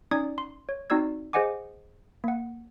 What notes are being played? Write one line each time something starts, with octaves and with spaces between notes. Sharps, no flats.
C#4 D#4 D5 D#6 G#6
C6
C#5
C4 D#4 F#4 D5 E6 G#6
G#4 C5 D#5 F#5 G#5 D6
A#3 F#5